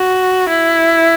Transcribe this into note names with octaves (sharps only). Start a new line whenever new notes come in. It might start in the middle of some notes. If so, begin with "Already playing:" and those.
Already playing: F#4
E4